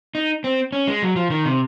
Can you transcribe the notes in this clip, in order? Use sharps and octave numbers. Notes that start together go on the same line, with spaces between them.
D#4
C4
C#4
G#3
F#3
F3
D#3
C3